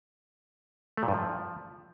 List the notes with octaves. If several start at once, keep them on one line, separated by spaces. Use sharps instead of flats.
A3
A#2
G2
F3